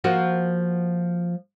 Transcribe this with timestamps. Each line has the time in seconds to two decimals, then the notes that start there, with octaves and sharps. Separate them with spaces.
0.04 F3 A#3 F#4